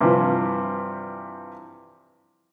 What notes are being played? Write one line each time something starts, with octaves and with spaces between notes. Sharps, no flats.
G2 C3 E3 F3